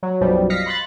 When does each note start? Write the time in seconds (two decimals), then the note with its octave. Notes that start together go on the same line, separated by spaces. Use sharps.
0.03 F#3
0.21 B1 F#2 B2 F3 G3
0.50 D#5 F5 A#6 B6 C#7
0.66 B5 C6 F#6 A6